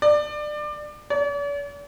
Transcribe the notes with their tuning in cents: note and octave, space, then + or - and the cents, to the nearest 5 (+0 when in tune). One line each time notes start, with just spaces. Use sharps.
D5 +25
D5 -45